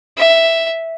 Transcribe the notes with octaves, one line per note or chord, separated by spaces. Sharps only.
E5